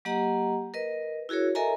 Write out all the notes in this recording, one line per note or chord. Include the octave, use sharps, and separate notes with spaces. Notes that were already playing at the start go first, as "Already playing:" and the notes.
F#3 A#3 G4 D#5 F#5 A#5
A#4 B4 D#5
E4 F#4 G#4 A#4 C#5
A4 A#4 D#5 E5 G#5 A#5